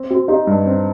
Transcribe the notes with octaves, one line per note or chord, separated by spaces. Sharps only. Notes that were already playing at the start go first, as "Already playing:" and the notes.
Already playing: C4
C4 F#4
D#4 G4
G2
C4